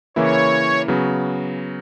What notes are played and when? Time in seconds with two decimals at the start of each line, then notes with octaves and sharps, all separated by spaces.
0.16 C#3 E3 A#3 E4 C#5
0.88 C#3 F#3 B3